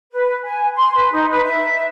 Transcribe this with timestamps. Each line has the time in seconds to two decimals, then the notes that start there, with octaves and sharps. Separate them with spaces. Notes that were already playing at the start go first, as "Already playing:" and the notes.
0.12 B4
0.45 G#5
0.76 C6
0.95 B4
1.12 D#4
1.31 B4
1.44 E5